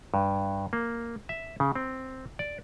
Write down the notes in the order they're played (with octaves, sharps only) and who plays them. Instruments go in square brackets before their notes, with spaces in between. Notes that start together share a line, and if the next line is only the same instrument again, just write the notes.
[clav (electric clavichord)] G2
A#3
E5
C#3
C4
D5